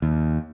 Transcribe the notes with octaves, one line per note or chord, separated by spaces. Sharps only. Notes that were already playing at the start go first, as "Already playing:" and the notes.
D#2